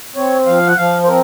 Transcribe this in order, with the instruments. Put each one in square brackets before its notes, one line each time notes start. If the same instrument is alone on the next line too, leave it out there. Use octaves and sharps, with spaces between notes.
[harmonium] C4 C#5
F3 F5
F#5
F3 F5
C5
C4 A#4